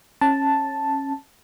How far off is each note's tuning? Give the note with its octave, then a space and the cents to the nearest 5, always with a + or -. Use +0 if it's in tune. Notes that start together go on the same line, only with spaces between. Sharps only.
C#4 -20 A5 +0